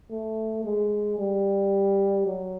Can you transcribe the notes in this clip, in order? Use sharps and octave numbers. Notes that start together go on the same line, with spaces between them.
A3
G#3
G3
F#3